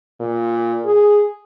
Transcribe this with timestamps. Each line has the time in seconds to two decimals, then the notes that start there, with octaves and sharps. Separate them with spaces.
0.20 A#2
0.85 G#4